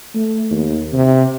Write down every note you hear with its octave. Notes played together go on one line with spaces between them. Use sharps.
A3
D#2
C3